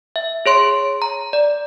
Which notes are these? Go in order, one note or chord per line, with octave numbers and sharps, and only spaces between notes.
E5
G#4 C#5 C6 D7
A#5
D5